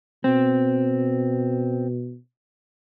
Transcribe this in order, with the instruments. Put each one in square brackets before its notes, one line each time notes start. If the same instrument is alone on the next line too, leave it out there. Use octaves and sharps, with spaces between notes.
[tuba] B2 [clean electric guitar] C4